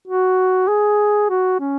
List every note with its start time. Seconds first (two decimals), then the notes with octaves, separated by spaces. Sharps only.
0.08 F#4
0.68 G#4
1.30 F#4
1.60 C#4